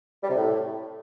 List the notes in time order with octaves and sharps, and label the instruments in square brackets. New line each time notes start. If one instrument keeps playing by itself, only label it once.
[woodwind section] G3
C3
A2